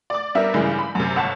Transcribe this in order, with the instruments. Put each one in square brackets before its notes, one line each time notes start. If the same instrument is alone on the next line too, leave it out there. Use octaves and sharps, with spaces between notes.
[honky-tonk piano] D5 D6
G3 B3 D4 A#4 E5
G2 C#3 E3 G3 G#3
B5
F#2 C3
G1 F#5 A5